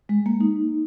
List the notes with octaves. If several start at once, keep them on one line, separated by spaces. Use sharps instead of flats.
G#3
A#3
D#4